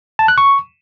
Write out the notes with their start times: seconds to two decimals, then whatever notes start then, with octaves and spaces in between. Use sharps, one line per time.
0.19 A5
0.28 F#6
0.38 C#6